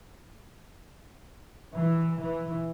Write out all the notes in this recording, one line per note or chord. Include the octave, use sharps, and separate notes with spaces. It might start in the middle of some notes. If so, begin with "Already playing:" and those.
E3
E3